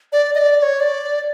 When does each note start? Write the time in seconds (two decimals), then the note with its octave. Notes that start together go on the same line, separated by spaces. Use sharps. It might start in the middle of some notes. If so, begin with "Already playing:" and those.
0.12 D5
0.35 D#5
0.39 D5
0.58 D5
0.62 C#5
0.80 D5